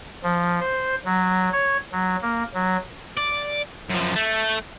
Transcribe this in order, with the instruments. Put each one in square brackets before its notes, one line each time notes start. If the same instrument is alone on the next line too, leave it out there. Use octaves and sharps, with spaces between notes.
[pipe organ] F3
C5
F#3
C#5
F#3
A#3
F#3
[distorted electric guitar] D5
F#2 F3
A3